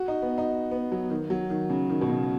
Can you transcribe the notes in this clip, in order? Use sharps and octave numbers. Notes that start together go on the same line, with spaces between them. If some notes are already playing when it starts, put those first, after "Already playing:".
Already playing: F#4
D#4
B3
D#4
B3
F#3
D#3
F#3
D#3
C#3
D#3
B2
C#3